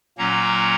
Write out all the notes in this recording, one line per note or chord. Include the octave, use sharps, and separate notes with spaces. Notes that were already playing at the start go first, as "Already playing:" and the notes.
A#2 F#3 A#3 C#4 F#5 A#5